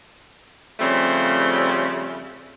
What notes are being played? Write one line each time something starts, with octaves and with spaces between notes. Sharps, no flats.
C#3 F3 G3 A3 C4